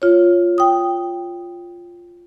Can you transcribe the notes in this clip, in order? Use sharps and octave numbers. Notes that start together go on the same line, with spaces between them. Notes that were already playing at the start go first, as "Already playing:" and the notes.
F4 C#5
G5 D#6